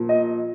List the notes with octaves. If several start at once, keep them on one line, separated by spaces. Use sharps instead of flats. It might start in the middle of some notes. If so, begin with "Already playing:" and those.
Already playing: A#2 F3 A#3
D#5